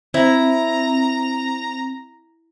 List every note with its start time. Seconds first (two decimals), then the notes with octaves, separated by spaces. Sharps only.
0.14 C4 E4 A#5